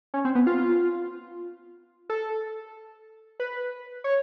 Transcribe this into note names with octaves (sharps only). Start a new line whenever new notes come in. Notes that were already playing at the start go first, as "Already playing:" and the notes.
C#4
C4
B3
F4
A4
B4
C#5